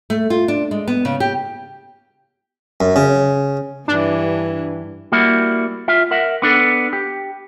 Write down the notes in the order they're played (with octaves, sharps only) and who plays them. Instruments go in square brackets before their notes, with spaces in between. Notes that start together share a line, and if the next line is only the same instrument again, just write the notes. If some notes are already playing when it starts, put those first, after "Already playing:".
[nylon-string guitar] A3
F4
D4
G#3
B3
C#3
G4
[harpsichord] F#2
C#3
[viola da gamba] G2 E3 [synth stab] D4
[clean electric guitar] G3 A#3 E4 F#4
F4 E5
A#4 E5 F#5
B3 D4 A4
G4